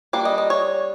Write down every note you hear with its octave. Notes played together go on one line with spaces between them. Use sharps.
G3 A#3 D4 D5
D#5
D#5
C#5